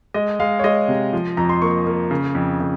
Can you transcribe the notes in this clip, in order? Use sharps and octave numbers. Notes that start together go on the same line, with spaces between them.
G#3 D#5
G#3 F5
C#5
G#3 D#5
C3
F3
F2 A#5
C6
A#3 C#6
A#3
C#3
F2
C#3